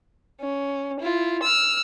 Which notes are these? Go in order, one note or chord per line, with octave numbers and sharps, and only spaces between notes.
C#4
E4 F4
E6 F6